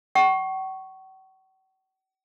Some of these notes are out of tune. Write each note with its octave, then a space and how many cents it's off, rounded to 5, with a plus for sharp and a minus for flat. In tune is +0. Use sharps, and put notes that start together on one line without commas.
F#5 +45 C#6 +0